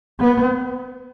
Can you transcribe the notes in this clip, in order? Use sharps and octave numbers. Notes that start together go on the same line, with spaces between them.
B3